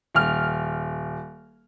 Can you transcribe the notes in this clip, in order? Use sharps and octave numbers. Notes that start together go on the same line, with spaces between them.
D#1 F6